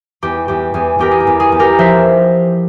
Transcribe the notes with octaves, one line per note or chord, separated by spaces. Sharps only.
E2 G4
E2 G4
E2 G#4
E2 G4 A#4
G#4
G4
E2
G#4
E2
G4 A#4
F3 C5 E5